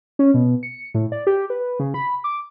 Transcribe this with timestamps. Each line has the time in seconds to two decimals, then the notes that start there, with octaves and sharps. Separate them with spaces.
0.19 C#4
0.34 B2
0.63 C#7
0.94 A2
1.12 D5
1.27 G4
1.50 B4
1.79 C#3
1.94 B5
2.24 D6